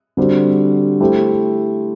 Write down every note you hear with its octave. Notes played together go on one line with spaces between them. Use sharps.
D3 G3 C4 F#4 C5
A3 E4 G4 C5